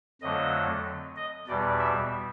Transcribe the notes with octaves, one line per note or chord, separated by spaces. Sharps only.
F2 D3 F#3 A3 D#5
D#5
E2 B2 G3 D5
E5